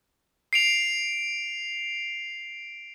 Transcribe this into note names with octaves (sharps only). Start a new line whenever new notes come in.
C7 D7 F7